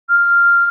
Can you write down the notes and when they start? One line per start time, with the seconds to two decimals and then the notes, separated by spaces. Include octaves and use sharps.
0.09 F6